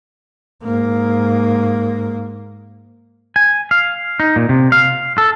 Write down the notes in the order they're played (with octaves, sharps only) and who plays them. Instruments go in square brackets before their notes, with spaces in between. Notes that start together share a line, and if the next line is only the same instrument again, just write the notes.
[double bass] G#2 A#3
[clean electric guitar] G#5
F5
D#4
A#2
C3
F5
A4